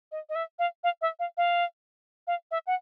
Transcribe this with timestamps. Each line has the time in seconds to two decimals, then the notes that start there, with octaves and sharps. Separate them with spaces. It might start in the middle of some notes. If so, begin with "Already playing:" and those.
0.12 D#5
0.29 D#5
0.35 E5
0.59 F5
0.84 F5
1.02 E5
1.19 F5
1.37 F5
2.27 F5
2.51 E5
2.67 F#5